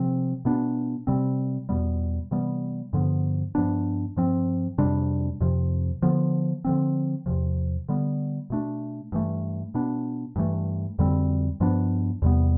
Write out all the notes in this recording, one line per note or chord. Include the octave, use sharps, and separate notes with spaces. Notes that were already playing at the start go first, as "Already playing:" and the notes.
Already playing: C3 F3 C4
B2 B3 D4
C3 G3 C4
E2 B2 G3 B3
C3 E3 G3 B3
G2 D3 F3 B3
G2 F3 B3 D4
G2 F3 C4
F2 C3 G3 D4
F2 C3 F3
D3 F3 B3
D3 F3 C4
E2 C3 F3
D3 G3 B3
B2 A3 D4
G2 E3 A3
B2 B3 D4
G2 E3 A3
F2 D3 G3 C4
G2 F3 B3 D4
E2 C3 G3 B3